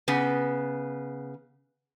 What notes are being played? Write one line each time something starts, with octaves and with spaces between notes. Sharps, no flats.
C#3 B3